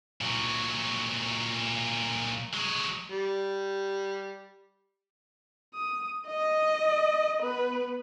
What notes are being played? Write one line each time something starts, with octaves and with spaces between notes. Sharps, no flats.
A#2 F#3
F#3 G#3
G3
D#6
D#5
B3 B4